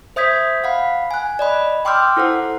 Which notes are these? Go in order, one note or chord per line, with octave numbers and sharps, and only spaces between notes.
C5 E5 D#6 G6 G#6 B6
F5 F#5 B5
G#5 F#6
D5 D#5 B5
G5 C6 D6 E6 F6 G6
E4 A4 C5 F#5